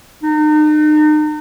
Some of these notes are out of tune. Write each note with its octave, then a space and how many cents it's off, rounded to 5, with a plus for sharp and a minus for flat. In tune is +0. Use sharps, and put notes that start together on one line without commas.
D#4 -40